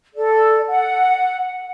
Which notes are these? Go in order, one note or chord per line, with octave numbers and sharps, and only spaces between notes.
A4 D5
F#5